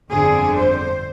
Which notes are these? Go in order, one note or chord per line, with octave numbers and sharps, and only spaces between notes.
G1 F2 D3 G#4
C5